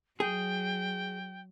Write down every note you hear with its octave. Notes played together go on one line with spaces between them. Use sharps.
F#3 G#4 G5